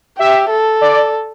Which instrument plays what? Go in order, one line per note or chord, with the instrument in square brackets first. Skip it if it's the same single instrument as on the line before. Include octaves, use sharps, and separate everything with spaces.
[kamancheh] G4 [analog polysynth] E5
[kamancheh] A4
[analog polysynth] D5